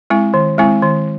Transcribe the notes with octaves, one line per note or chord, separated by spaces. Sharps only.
G#3 C4 E4
D#3
G#3 C4 E4
D#3